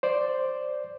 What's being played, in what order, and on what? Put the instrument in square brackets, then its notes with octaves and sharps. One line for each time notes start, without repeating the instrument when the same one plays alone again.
[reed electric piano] C5 D5